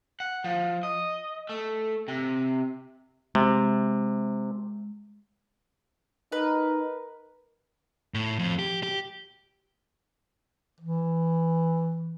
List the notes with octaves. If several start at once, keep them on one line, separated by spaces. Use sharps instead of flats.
F#5
F3
D#5
A3
C3
C3 G#3
D#4 A#4 B4
A2
F2
G4
G4
E3